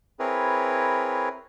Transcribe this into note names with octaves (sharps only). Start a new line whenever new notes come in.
C4 E4 G#4 A#4 B4 C#5